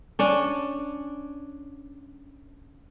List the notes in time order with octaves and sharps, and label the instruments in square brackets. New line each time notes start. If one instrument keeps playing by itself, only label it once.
[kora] C#4 D4